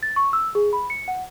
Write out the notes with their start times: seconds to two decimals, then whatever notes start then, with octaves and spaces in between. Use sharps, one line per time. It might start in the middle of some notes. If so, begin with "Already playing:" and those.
0.03 A6
0.16 C#6
0.33 E6
0.55 G#4
0.73 B5
0.90 C#7
1.08 F#5